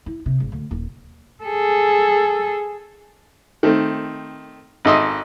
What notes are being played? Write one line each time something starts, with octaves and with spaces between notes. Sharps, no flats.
E4
C3
G#1
D2
D#1
G#4 A4
D#3 A3 C4
G#1 D#4 A4 D#5 E5 C6